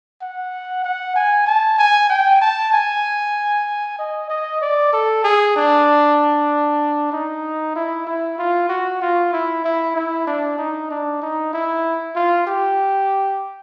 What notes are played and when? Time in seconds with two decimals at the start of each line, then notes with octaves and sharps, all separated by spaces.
0.22 F#5
0.84 F#5
1.16 G#5
1.47 A5
1.79 G#5
2.09 G5
2.41 A5
2.73 G#5
3.99 D#5
4.30 D#5
4.62 D5
4.93 A4
5.24 G#4
5.56 D4
7.12 D#4
7.76 E4
8.07 E4
8.39 F4
8.70 F#4
9.02 F4
9.33 E4
9.65 E4
9.96 E4
10.27 D4
10.59 D#4
10.91 D4
11.22 D#4
11.53 E4
12.16 F4
12.47 G4